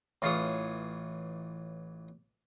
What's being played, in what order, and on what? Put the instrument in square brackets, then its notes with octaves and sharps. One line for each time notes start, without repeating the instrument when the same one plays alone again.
[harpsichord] A1 E3 F4 G#4 C#5 D#6